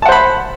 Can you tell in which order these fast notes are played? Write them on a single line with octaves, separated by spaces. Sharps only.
A5 F#5 C5 B5